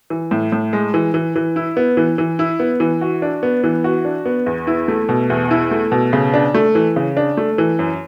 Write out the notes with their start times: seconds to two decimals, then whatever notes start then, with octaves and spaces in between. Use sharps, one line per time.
0.10 E3
0.31 A2
0.52 A2
0.73 G#3
0.94 E3
1.14 E3
1.36 E3
1.56 E4
1.77 B3
1.97 E3
2.18 E3
2.39 E4
2.60 B3
2.80 E3
3.01 F#4
3.22 D4
3.43 B3
3.64 E3
3.84 F#4
4.05 D4
4.25 B3
4.46 E2
4.67 E4
4.88 A3
5.09 B2
5.30 E2
5.51 E4
5.71 A3
5.92 B2
6.13 C#3
6.34 D4
6.54 A3
6.75 E3
6.96 C#3
7.17 D4
7.37 A3
7.58 E3
7.79 F#2